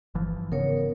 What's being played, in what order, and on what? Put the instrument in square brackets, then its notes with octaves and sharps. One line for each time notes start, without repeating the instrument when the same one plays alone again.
[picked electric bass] G1 E3 F3
[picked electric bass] G#2 C#3 B3 [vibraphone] A#4 C#5